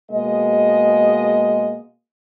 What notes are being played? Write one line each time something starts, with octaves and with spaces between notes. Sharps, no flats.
B2 G#3 A#3 D#5